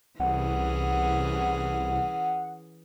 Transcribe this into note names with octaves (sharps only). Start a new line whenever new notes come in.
C2 E3 C#4 G#4 F#5